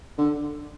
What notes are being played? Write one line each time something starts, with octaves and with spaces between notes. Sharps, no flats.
D3